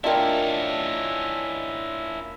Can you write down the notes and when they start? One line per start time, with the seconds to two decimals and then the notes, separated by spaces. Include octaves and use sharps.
0.04 C#4 D4 E4 F4 A#4 D#5 G5